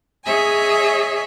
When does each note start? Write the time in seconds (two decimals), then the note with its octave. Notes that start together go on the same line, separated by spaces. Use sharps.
0.25 G#4 C#5 D#5 E5 G#5